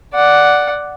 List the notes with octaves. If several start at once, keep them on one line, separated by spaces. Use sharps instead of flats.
D5 F#5